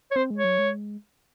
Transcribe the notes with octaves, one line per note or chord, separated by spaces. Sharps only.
C#5
C4 C5
G#3
C#5
F#3
G#3